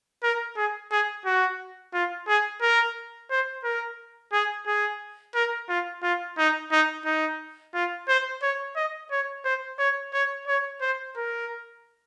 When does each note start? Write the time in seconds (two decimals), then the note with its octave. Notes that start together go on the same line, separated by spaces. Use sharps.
0.23 A#4
0.57 G#4
0.91 G#4
1.26 F#4
1.93 F4
2.28 G#4
2.62 A#4
3.30 C5
3.64 A#4
4.33 G#4
4.66 G#4
5.35 A#4
5.69 F4
6.03 F4
6.38 D#4
6.72 D#4
7.06 D#4
7.74 F4
8.08 C5
8.42 C#5
8.76 D#5
9.11 C#5
9.45 C5
9.79 C#5
10.13 C#5
10.48 C#5
10.81 C5
11.16 A#4